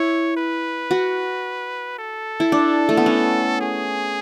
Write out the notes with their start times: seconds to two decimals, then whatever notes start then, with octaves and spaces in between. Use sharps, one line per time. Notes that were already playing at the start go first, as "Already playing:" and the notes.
Already playing: E4 C#5
0.37 B4
0.91 F#4
1.99 A4
2.40 E4
2.52 D4
2.89 A3
2.97 B3
3.06 C#4
3.61 G#4